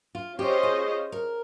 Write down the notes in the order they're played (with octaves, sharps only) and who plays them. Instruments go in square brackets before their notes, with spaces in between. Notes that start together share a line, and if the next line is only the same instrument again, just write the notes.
[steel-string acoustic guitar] F4
[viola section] C#4 F4 C5 D#5 [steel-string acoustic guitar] G4
[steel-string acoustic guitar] G#4
A#4